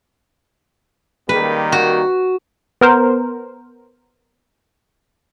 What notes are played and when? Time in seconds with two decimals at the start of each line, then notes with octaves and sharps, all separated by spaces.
1.29 D#3 G3 A#3 B4
1.72 F#4
2.81 B3 A#4 C5